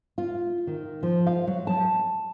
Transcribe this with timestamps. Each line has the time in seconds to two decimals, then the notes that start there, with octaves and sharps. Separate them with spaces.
0.18 F4
0.67 D#3
1.03 F3
1.27 F5
1.47 F#3
1.67 A5